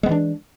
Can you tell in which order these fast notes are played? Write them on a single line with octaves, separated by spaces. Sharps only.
G#3 B3 E3 D4